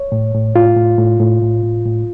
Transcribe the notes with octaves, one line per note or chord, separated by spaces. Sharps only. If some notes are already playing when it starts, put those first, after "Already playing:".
Already playing: C#5
A2
A2
A2 F4
A2
A2
A2
A2
A2
A2